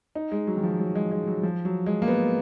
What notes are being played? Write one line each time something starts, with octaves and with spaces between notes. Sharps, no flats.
D#4
G#3
F#3
D#3
F3
F#3
G#3
G#3
F#3
F3
F#3
G#3
A#3
B3